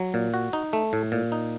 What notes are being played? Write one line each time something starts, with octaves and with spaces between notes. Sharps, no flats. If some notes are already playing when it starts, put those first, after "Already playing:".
Already playing: F#3
A#2
F#4
D#4
A3
A2
A#2
D#4